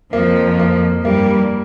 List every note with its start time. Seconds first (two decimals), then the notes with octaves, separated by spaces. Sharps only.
0.13 F2 F3 A#3
0.59 A#3
1.05 G2 G3 A#3